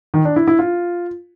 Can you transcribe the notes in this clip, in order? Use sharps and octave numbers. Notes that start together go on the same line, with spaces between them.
D#3
D4
E4
E4
F4